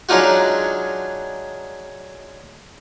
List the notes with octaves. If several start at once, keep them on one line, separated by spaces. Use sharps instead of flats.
F#3 G#3 D4 D#4 F4 F#4